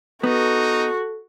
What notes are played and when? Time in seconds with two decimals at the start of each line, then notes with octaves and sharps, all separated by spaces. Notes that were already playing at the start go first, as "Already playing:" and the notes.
0.23 B3 D#4 F#4 A4